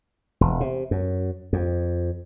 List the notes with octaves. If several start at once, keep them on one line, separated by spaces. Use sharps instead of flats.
E1
C3
F#2
F2